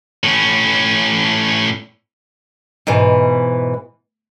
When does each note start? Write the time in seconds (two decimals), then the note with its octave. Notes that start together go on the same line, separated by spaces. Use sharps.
0.24 A2 C#4
2.87 G#2 B2 E3